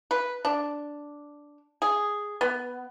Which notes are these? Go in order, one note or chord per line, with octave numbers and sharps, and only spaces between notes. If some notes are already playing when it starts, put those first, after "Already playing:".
B4
D4
G#4
B3